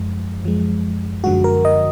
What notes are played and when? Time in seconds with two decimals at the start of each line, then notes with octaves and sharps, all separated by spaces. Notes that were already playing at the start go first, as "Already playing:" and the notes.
Already playing: F#2 F3 G#3
0.44 F#2 F3 G#3
1.24 F#2 D3 F3 G#3 F#4
1.44 A#4
1.65 D#5